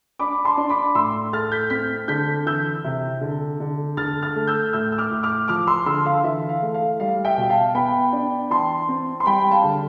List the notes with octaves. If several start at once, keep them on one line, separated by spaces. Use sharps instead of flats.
D4 B5 D6
A5 C6
D4
B5 D6
A2 C6 E6
A3 F6 A6
G6 B6
C4 G6 B6
D3 G6 B6
E3 E6 G6
C3
D3
D3
D3 F6 A6
F6 A6
A3
E6 G6
A2 E6 G6
E6
D6 F6
A2
D6 F6
F3 D6 F6
C6 E6
D3 C6 E6
F5
E3 E5
F5
A3
F5
G3 F5
E5 G5
B2
F5 A5
B3 G5 B5
D4
E3 A5 C6
C4
C6
G3 G5 B5
F5 A5
D3